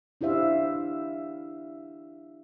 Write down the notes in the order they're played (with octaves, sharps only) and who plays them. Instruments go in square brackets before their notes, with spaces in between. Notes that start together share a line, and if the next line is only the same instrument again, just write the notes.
[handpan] D4 E4 G4 C5 E5 F5